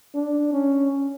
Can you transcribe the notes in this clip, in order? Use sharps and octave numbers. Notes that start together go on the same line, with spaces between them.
D4
C#4